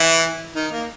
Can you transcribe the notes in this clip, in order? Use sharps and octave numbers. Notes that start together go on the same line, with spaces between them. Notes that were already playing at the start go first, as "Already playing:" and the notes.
Already playing: E3 E4
D#3 D#4
A#3